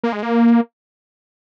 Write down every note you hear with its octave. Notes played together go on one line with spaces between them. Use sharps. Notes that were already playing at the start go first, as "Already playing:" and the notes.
A#3
G#3
A#3